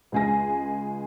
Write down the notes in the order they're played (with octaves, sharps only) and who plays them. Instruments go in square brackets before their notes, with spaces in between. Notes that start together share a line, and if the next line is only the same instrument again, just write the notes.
[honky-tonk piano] C#2 G#3 G#4 G#5 A#6